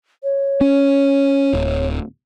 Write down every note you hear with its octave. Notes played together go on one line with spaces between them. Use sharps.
C#5
C#4
D1